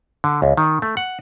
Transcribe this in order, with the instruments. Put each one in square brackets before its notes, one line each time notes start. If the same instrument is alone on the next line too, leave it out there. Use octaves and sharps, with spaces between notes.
[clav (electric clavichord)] D3
C#2
D#3
A3
F#5